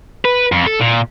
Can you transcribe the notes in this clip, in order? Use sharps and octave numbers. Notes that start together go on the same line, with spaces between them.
B4
F2
A4
A#2